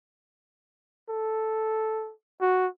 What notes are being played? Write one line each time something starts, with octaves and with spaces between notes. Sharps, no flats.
A4
F#4